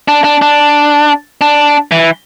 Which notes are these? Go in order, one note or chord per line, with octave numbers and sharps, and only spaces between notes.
D4
D4
D4
D4
E3